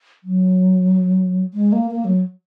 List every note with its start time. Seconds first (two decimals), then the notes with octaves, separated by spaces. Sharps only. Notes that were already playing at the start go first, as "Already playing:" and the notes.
0.24 F#3
1.54 G#3
1.72 A#3
1.91 A#3
2.05 F#3